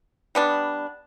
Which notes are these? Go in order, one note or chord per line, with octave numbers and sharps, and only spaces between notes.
G3 B3 D4